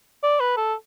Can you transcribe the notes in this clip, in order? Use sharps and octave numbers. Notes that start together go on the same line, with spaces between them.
D5
B4
A4